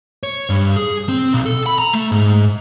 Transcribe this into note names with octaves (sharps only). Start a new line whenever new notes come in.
C#5
G2
G#4
C4
B1
A4
B5
A#5
A3
G#2